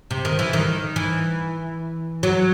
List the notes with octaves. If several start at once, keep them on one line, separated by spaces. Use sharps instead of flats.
C3
D#3
E3
D#3
E3
F#3